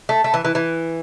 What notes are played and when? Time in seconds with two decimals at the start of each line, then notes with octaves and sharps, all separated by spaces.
0.09 A3
0.24 A3
0.34 E3
0.45 E3
0.55 E3